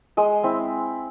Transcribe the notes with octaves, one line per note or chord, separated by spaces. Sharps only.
G#3 D#5
C4 E4